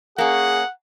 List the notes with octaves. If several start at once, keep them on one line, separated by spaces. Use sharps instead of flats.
A#3 C#4 G#4 F#5